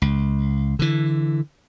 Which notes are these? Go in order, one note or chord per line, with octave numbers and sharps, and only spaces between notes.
C#2
D3 E3